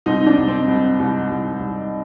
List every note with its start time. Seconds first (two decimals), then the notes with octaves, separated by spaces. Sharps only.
0.06 C2 C4 D#4
0.27 D4
0.37 C2
0.48 C4
0.68 C2
1.00 C2
1.30 C2
1.60 C2